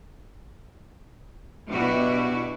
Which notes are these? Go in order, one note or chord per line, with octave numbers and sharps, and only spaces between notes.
B2 D4 E4 F#4 G4